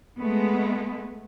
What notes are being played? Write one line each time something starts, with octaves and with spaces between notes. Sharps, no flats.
G#3 A3 B3